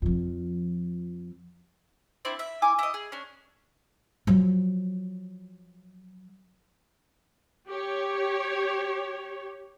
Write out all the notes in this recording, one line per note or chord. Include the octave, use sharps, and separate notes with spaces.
F2 F3
C4 D4 E4
E5
E4 G#5 D6
E4 D#5
G#4
C#4 D4
F3 F#3
G4 C#5